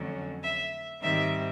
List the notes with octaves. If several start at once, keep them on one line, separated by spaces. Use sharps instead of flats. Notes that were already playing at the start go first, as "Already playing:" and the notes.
Already playing: F2 D3 F#3 A3 C#4
E5
G#2 D#3 G3 C4 E5